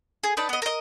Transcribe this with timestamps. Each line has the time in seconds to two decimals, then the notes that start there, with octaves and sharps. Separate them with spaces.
0.23 G#4
0.37 D#4 B4 D5 A5
0.49 B3 D#5
0.62 A#4 D#5